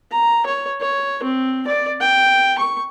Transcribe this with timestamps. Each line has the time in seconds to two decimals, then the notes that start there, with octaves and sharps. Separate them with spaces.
0.11 A#5
0.46 C#5
0.81 C#5
1.23 C4
1.67 D5
2.01 G5
2.58 C#6